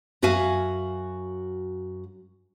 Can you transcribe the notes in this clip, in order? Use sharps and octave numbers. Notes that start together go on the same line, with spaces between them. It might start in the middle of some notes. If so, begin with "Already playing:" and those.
F#2 F#4 E5 F5 G#5